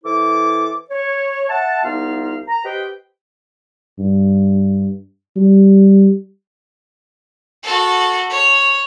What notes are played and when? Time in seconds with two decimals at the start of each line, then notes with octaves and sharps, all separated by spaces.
0.04 E3 E4 A4 C5 D6
0.91 C#5
1.49 E5 F#5 A5
1.84 C2 B3 D#4 F4 F5
2.48 A#5
2.65 G4 B4 C5 D#5 G5
3.98 G2
5.36 G3
7.63 F#4 A4
8.30 C#5